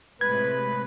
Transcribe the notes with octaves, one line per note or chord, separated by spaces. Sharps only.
A2 C3 G#3 B4 G#6